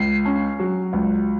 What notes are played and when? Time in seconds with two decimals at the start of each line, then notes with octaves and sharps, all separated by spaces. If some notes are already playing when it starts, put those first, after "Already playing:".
Already playing: C#2 C7
0.25 C#4
0.59 F#3
0.93 C#2